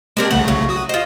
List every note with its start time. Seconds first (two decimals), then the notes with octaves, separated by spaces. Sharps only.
0.17 G#3 A#3 C4 D4 G4 A#4
0.31 C2 C#3 A3 F#5
0.48 F#3
0.69 F#4 D#6
0.89 F4 C5 D#5